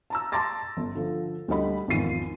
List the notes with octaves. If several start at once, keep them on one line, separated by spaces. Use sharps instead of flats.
A5 A#5 E6
A5 A#5 C6 D6 A6 A#6
G1
D3 F3
D2 G3 D4 D#5 B5
G#1 E2 D#3 F3 C7 D#7